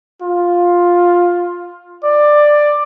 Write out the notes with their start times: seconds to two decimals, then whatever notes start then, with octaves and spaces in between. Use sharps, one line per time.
0.22 F4
2.04 D5